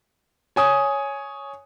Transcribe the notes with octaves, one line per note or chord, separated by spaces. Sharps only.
C#5 G#5 D#6